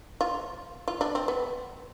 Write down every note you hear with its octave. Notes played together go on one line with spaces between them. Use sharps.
F4
F4
D4
C4
B3